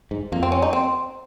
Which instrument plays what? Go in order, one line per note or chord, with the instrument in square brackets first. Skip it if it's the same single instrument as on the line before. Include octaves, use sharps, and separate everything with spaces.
[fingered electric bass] G#2
[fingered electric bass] F2 [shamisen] A#3
[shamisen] C4
C#4
D#4
C4